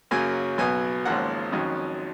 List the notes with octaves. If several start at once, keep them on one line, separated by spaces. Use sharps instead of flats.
F#2 C#3 F#3 A#3 C#4 G#5
B1 B2 F#3 B3 G#5
G#1 G#2 F3 A#3 C#4 F#5
F2 D#3 F#3 C#4